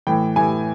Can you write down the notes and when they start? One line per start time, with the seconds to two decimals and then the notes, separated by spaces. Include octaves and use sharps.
0.07 A2 E3 G5
0.36 A2 E3 G#5